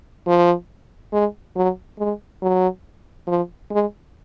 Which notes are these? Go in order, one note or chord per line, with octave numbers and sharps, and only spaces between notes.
F3
G#3
F#3
G#3
F#3
F3
G#3